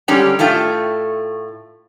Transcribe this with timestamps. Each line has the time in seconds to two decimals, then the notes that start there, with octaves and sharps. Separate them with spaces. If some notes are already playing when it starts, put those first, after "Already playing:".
0.08 D3 G3 G#3 C#4 G4 A#5
0.39 A2 A3 F4 G5